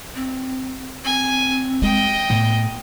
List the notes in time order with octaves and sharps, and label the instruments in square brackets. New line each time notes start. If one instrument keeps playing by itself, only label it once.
[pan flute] C4
[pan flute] C4 [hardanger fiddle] G#5
[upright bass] G#3 [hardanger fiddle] D#5 G5
[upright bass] A2 [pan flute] B3